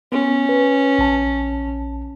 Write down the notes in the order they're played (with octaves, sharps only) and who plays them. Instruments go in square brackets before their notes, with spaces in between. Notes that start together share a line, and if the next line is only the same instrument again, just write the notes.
[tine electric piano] B3 [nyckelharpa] C#4
[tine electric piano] B4
A#1 A5